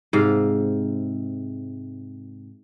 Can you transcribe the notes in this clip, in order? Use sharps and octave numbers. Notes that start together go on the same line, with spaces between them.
G#2 C3 F5